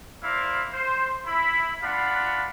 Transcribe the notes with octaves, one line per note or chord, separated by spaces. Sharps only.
E4 A#4 C5 D5 F5
C5
E4 B5
D4 F4 F5 F#5 B5